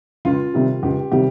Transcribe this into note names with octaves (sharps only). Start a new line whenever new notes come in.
C#2 F4
C3 D#3 G3
C#2 G4
C3 D#3 G3 G4